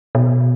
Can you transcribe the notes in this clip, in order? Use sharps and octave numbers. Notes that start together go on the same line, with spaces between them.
B2